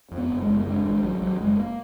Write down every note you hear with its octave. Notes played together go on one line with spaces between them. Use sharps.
F2
B3
F#1
G#3
F#1
A#3
D3 G#3
G#1 G#3
G#1 F#3
G#1 F#3
F#1 G#3
A#3